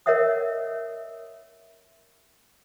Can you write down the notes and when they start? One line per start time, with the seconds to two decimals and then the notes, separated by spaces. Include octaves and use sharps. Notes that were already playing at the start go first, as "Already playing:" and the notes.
0.06 A#4 C#5 D#5 E5 F#5 D#6